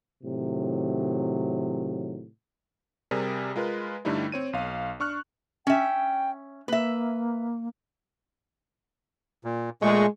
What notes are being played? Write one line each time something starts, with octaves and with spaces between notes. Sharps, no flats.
A2 C3 D#3 F#3
C3 G3 G#4 A#4
G#3 F4 A#4 B4
G2 D3 G3 A3 D#4 E4
C4 C#5 D#7
B1 F5
D4 C#6 F6 F#6
C#4 E5 G5
A#3 B4 E5
A#2
A#2 G#3 A3 C#6